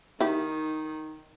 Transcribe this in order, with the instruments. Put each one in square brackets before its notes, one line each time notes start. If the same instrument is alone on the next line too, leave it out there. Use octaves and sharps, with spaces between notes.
[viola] D#3 [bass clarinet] D#4 [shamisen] E4 G4